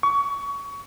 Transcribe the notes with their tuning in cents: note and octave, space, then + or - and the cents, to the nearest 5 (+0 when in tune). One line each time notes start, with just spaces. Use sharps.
C#6 +25